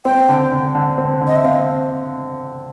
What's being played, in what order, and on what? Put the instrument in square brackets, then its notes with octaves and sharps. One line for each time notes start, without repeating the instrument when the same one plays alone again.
[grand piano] C4 [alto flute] G5
[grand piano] D3
D3
D3
C4
D3
[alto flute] D#5
E5
[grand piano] C4 [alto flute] F5